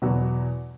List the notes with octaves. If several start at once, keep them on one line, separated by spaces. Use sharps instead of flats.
E2 B2 F#3 B3 F#4